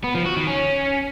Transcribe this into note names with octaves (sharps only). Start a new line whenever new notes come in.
B3
F3
F#4
D#3
C#4